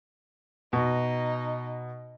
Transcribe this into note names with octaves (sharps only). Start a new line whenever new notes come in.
B2 D#4